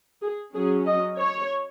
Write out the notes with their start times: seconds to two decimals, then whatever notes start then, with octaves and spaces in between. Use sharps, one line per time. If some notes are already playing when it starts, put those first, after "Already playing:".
0.23 G#4
0.54 F#3 C#4 G#4
0.86 D#5
1.17 C#5